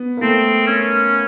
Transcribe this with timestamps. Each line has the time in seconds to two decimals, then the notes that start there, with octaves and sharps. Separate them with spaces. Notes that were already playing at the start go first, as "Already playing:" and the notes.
Already playing: B3
0.17 A#3
0.21 A3 C4
0.67 C#4